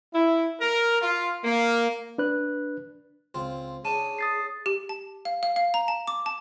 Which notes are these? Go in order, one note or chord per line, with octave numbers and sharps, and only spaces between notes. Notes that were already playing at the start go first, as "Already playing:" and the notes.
E4
A#4
F4
A#3
D4 B4 F#6
C#2 C4 F4
C#4 D4 G#4 A5 D#7 E7
D#6 A6 C7
G4
A5
F5
F5
F5
A#5
A5
D6
A5